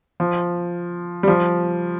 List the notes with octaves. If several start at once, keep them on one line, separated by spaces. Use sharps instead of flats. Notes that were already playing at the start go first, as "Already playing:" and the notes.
F3
G3
F3